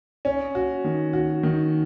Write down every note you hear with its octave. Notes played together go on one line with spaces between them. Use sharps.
C#4
F#4
D#3
F#4
D#3